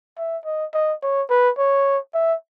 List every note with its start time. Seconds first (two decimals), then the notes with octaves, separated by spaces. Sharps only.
0.18 E5
0.45 D#5
0.74 D#5
1.03 C#5
1.30 B4
1.58 C#5
2.14 E5